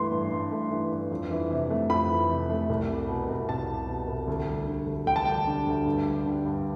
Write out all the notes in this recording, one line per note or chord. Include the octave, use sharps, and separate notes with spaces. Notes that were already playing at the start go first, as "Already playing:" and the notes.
Already playing: G2 E3 A3 C6
G2
G2
A3
E3
G2
F2
E3
C3
A3
F2 B5
E3
C3
A3
C2
G3
B2
C2
C2 A5
G3
B2
C2
D2
G3
D3
D2
D2 G5
A5
G3 G5
D3
D2
G2
G3
D3
G2